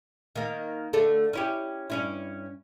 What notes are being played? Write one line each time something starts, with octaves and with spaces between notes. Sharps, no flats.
D#3 A#3
D3 A3 A4
C#4 E4 G4
G2 C#4 E4